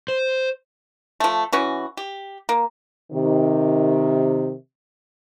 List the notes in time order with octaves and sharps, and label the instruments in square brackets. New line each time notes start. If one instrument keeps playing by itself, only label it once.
[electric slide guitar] C5
[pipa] F3 A3
E3 C#4 F#4
G4
A#3
[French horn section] C3 D#3